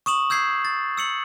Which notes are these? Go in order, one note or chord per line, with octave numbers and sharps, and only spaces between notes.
C#6 D#6 E7 F#7
E6 G6 G#6 C7
A6
E6 C#7 F#7